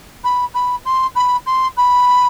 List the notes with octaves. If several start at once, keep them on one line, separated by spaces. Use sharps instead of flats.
B5
B5
C6
B5
C6
B5